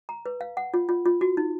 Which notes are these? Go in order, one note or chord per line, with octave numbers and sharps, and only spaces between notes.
A#5
B4
F5
F#5
F4
F4
F4
F#4
D#4